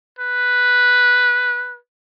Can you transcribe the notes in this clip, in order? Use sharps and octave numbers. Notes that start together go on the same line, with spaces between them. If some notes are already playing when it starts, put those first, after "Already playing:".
B4